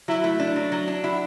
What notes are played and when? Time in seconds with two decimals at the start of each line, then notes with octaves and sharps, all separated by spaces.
0.08 F#3 E4
0.24 A3
0.40 D4
0.56 F#3
0.72 F#3
0.88 D4
1.04 E4 F#4